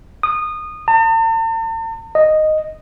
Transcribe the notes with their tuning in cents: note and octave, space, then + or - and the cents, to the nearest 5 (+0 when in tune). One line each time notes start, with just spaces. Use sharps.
D#6 -20
A5 +45
D#5 -5